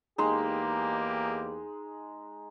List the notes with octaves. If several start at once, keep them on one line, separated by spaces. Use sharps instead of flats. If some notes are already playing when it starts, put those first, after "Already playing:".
E2 G#3 A#3 D#4 G4